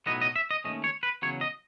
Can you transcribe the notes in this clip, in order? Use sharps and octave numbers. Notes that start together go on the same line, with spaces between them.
B1 A2 F#3 B3 D#5
D#5
E5
D#5
D#2 D#3 A3 C#4 D#5
C#5
B4
E2 C#3 F#3 C#5
D#5